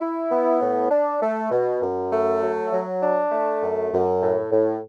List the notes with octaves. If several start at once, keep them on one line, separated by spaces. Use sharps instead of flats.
E4
B3
A2
D4
A3
B2
F#2
A3
F#3
F#3
D4
A3
F#2
F#2
A2
A2